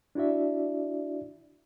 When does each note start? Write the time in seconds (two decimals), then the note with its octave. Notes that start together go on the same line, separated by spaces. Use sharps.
0.15 D4 E4 F#4 D5 E5